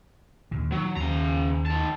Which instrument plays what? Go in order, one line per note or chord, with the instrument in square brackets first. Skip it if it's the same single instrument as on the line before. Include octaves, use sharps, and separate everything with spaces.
[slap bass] D#2 A#2 D3
[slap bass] D#3 [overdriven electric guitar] F#3
[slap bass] D#2 [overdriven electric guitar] C#3 A#5
[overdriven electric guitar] D#3 A5